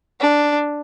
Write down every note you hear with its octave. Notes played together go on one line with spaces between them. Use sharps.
D4